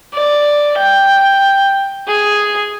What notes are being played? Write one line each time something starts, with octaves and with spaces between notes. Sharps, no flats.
D5
G5
G#4